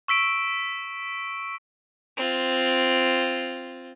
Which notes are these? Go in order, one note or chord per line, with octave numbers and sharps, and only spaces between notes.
C#6 E6 B6 D7
C4 F4